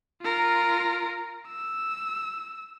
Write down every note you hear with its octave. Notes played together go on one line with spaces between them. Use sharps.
F4 A#4
E6